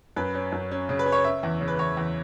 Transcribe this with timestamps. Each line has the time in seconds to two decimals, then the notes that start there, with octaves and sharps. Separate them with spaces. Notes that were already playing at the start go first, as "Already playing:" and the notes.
0.16 F#2 B4
0.35 C#4
0.52 F#2
0.71 C#4
0.89 C#3
0.99 B4
1.06 C#4
1.12 C#5
1.24 C#4 E5
1.43 E2
1.61 C#3
1.68 B4
1.79 E2 C#5
1.97 E2